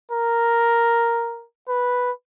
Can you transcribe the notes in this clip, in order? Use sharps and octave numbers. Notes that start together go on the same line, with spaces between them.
A#4
B4